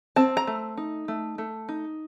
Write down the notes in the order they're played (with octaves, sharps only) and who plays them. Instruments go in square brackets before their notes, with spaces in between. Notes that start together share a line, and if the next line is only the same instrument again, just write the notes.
[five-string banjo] C4 A5
A#5
A3
D#4
A3
A3
D#4